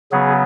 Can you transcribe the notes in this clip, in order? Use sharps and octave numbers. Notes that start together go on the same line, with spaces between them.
C#3 F#3 B3 G#4